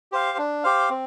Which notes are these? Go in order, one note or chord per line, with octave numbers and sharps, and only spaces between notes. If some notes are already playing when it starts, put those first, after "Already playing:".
G4 C5 F5
D4
G4 C5 F5
C4